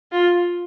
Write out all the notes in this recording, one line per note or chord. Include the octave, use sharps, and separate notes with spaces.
F4